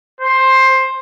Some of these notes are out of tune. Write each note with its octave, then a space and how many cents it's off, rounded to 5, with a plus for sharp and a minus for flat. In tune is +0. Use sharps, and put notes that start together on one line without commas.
C5 +10